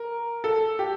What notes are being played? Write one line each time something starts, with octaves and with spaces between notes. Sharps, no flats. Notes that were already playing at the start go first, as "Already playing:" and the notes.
Already playing: A#4
A4
G4